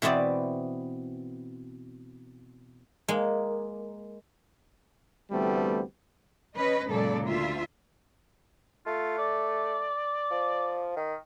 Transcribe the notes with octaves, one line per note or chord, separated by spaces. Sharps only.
B2 E3 B3 C4 D5
G#3 A#3
D2 E3 G3 A3 B3 C4
C#4 B4 D#5
F#2 A#2 C#3 G#3 A4 D5
D2 F4 E5
A3 F4
D5
F3
D#3